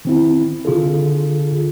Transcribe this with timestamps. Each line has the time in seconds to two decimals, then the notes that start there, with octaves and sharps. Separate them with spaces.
0.05 D#3 C4 E4
0.65 D3 F4 G#4 A4